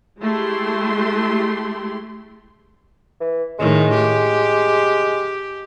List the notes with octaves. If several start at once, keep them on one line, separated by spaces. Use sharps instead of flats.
G#3 A3 E4 G4 C6
E3
A2 D#3 G#3
G4